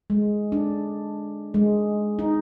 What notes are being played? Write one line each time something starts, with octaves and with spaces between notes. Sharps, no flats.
G#3
D4
G#3
D#4